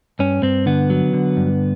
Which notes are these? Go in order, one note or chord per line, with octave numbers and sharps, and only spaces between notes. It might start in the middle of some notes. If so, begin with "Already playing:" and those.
G2 C#4
G2 C4
D3 B3
F#3
D3
G2